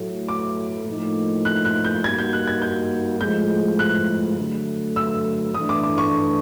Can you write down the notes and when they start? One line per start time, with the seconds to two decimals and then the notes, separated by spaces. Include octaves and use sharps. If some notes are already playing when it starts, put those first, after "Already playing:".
Already playing: A2 F#3 A3
0.28 D6
0.87 A2 F3 A#3 D#4
1.45 F#6
1.65 F#6
1.85 G6
2.04 G3 A#3 D#4 F#4 G#6
2.19 G6
2.33 F#6
2.47 G#6
2.62 G6
3.21 A2 F3 G#3 G6
3.79 F#6
4.37 D3 F#3 A3
4.96 E6
5.54 A2 E3 A3 D4 D#6
5.69 D6
5.84 D6
5.98 C#6